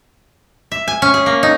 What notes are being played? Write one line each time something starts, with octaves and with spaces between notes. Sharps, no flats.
E5
G#5
C#4
G#4
A#3
D#4